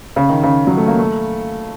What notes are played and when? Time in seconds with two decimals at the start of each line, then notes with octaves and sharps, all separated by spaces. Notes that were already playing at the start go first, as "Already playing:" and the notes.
0.16 C#3
0.29 D#3
0.43 C#3
0.67 F#3
0.77 A3
0.88 A#3
0.99 A3